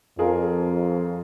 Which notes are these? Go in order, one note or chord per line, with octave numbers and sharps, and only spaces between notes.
F2 F4 G#4 A#4